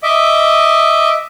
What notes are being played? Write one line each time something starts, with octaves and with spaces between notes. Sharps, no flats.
D#5 E5 D6